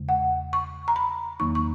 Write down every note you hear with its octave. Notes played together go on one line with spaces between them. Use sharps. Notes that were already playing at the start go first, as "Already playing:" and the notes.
Already playing: E2 C#3 G#3
F#5
C#6
A#5
B5
E2 D#3 F#3 A#3 D#4 C#6
C#6